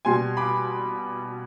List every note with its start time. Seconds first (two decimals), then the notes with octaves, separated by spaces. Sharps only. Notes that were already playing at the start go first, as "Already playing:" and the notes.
0.05 B2 G3 G#5 C6
0.37 B5 D6